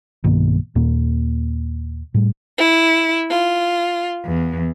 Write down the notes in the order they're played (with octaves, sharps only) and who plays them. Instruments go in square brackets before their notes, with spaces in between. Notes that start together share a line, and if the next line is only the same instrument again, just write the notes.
[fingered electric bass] B1 G2 D#3 A#3
D#2 A#2 A#3
A2 G3
[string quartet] E4
F4
E2